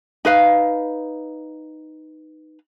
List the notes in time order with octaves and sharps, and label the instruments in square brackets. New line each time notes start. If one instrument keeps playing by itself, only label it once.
[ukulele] D#4 B4 F5